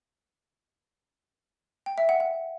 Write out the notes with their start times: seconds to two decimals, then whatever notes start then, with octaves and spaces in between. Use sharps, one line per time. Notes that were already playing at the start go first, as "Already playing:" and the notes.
1.86 G5
1.98 E5
2.09 F#5
2.20 F#5